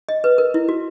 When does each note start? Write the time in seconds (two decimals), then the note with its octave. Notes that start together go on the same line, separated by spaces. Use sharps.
0.09 D#5
0.24 B4
0.38 A#4
0.54 E4
0.69 F#4